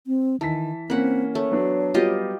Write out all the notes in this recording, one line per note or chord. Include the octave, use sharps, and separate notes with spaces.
C4
D#3 E3 A5 B6
A#3 C4 C#4 F#5 B5
A3 C#5
F#3 B3 D4
F#3 G3 B3 F4 G4 D#5